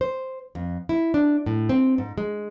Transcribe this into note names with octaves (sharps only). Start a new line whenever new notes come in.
C5
F2
E4
D4
A2
C4
G#2
G#3